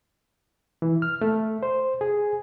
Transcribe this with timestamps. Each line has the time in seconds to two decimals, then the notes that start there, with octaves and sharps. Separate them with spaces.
0.82 E3
1.02 F6
1.21 A3
1.63 C5
2.01 G#4